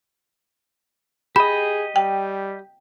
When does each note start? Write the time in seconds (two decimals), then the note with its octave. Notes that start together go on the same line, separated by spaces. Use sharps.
1.36 G4 G#4 D#5 B5
1.96 G3 G5